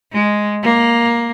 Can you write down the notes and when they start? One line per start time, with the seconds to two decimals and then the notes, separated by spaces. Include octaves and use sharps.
0.13 G#3
0.63 A#3